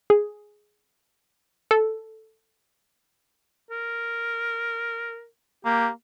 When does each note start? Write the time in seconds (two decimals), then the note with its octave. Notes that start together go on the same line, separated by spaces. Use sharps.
0.10 G#4
1.71 A4
3.70 A#4
5.65 A#3 G4